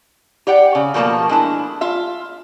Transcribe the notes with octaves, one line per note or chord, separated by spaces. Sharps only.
G4 D5 F#5 G5
C#3
B2 F3 A3 A#3 G#5 A5
G#3 D4 E4
F4 E5